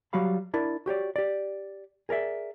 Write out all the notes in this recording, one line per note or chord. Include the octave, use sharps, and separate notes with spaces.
F#3 G3 F#4 F5 B5
D4 E4 A#4 D5
F#4 G4 C#5 D5
G4 D5
G#4 A#4 D5 E5